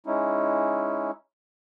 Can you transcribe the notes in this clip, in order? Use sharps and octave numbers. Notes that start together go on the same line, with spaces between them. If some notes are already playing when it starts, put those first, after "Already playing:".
G#3 C#4 D#4 E4